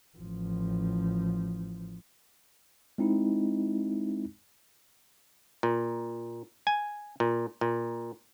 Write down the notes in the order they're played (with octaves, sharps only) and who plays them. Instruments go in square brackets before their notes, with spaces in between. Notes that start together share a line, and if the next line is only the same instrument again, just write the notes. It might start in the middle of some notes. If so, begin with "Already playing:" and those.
[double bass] A1 F3
[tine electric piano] G#3 C4 D#4 E4
[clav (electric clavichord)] A#2
G#5
A#2
A#2